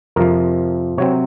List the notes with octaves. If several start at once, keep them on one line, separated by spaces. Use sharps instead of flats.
F2 C3 F3 A#4
C3 F#3 C4 C#5